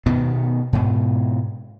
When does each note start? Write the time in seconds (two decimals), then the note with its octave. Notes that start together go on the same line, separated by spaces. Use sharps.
0.06 B2 D#3 B3
0.73 G#2 B2